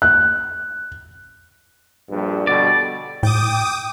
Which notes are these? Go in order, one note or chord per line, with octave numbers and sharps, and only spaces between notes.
F#6
A#1 G2
B2 D3 G3 D5
A2 G5 D6 D#6